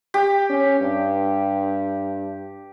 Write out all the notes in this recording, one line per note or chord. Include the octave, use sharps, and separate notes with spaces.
G4
C#4
G2